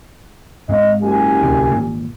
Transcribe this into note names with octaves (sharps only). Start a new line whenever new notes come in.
G#2 G#3 C4 D#5 F5
F#1 G4 G#5
D1 C2 C3
G#1 A#2